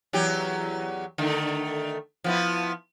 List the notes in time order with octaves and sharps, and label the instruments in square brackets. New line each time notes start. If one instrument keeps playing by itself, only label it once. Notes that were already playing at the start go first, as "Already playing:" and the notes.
[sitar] E2 F#3 G4
D3 D#3 A3
F3 B3 E4